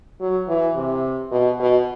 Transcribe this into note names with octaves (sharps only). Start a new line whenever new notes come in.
F#3
E3
C3
B2
B2